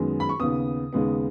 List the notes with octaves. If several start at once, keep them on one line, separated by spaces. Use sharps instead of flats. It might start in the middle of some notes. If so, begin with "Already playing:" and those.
Already playing: F#2 D#3 G#3 B3
B5
C#6
D#2 C#3 B3 D#6
D#2 C#3 G#3 B3